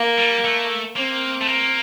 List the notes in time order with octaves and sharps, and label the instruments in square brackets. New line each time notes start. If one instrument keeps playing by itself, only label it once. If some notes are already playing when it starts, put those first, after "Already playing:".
Already playing: [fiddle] A#3
[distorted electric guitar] G3
A3
[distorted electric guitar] A#3 [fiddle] C4
[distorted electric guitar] A3
A#3